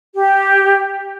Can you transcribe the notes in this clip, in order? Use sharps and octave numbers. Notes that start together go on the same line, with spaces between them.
G4